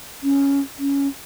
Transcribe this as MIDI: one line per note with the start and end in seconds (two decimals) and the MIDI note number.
0.23 0.60 61
0.79 1.08 61